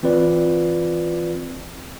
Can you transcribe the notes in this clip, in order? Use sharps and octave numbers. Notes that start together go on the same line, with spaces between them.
E3 C4 F4 B4 D5